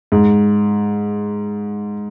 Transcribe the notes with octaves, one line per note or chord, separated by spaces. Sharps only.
G#2